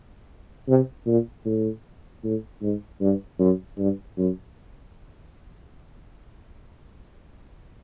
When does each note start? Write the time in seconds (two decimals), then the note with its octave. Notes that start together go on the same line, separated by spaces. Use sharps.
0.68 C3
1.06 A#2
1.45 A2
2.24 A2
2.62 G#2
3.01 G2
3.39 F#2
3.78 G2
4.17 F#2